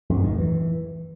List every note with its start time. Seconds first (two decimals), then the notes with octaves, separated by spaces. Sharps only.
0.10 F2
0.17 F#2
0.24 D#3
0.31 A2
0.38 E3